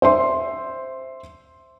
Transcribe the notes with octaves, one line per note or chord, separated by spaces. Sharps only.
C5 E5 C6